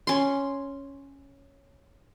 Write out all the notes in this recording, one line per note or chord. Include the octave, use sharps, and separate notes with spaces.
C#4 C6